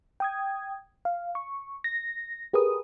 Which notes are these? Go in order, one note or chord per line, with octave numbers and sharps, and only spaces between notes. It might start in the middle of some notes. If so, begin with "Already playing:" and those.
G5 D#6 G#6
F5
C#6
A#6
G4 G#4 A#4 B4 D#6